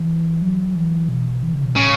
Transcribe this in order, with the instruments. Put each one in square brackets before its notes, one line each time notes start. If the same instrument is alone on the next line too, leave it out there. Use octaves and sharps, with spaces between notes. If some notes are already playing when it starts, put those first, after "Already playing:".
Already playing: [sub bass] E3
F#3
E3
B2
E3
C#3
B2
[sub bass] A2 [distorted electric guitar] C#3